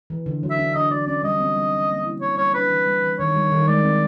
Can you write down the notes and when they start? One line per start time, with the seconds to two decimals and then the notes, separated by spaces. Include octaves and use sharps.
0.10 E3
0.26 D3
0.43 F#3
0.50 E5
0.59 D4
0.75 D3 D#5
0.91 F#3 D5
1.07 C#4 D5
1.23 G3 D#5
1.40 C4
1.56 G3
1.73 F3
1.89 A#3
2.05 E4
2.21 D3 C#5
2.38 G3 C#5
2.54 D4 B4
2.70 E3
2.87 G3
3.02 E3
3.19 D#3 C#5
3.36 G3
3.51 D#3
3.67 G#3 D5
3.84 C4